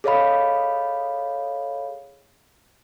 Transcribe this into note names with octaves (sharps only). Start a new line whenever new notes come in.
G#4 A4 C#5 D#5 F5 B5